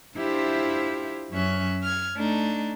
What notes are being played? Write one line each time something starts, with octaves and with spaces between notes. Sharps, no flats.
D4 E4 F4 G4 C5 E5
F#2 F#3 C#4 E5 F#6
F6 G#6
A3 D4 D#4